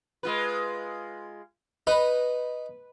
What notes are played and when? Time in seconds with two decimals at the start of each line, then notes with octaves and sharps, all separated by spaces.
0.23 G#3 F4 B4
1.87 D#4 B4